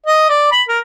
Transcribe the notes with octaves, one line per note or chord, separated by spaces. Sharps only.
D#5
D5
B5
A#4